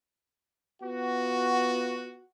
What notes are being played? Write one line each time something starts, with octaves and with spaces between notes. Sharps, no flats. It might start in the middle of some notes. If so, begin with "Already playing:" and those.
B3 F4 F#4